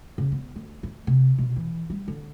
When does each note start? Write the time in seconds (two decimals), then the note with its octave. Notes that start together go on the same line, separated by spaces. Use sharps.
0.18 C#3
0.32 B3
0.56 D2
0.83 A3
1.07 C3
1.38 B2
1.56 E3
1.90 G3
2.08 D3